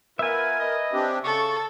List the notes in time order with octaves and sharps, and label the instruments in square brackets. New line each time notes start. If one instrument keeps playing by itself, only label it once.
[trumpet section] B3 F4 B4 [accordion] A#4 [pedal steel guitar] E5 G#5
[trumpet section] B4 D#5
[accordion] C4 D4 G4
[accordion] C#3 [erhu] A4 [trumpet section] C#6